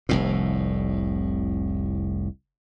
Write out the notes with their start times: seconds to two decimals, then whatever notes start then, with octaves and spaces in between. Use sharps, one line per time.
0.09 F1 C2 A2